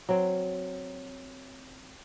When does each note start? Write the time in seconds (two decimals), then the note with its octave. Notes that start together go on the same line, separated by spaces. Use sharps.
0.09 F#3 C4